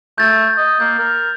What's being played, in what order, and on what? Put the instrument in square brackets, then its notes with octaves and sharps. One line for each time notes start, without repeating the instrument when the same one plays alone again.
[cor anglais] A3 [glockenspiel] G6 A6
[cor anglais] D#5
[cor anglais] A#3 [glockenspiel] G6
[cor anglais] A#4